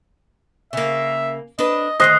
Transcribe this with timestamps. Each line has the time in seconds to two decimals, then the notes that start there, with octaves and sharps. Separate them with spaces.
0.73 C#3 A#3 E5
1.59 D4 B4 D#5
2.00 D2 D#3 C5 D#5 D#6 F#6 C7